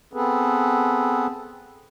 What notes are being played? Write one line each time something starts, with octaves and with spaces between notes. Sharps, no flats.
B3 C4 G#4 A4 B4